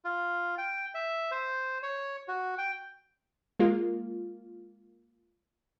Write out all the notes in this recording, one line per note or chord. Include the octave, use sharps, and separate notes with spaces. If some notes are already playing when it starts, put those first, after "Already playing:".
F4
G5
E5
C5
C#5
F#4
G5
G#3 A#3 F4